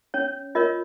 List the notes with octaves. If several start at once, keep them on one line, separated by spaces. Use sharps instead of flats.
C#4 C#5
F4 A#4 C#5 D#5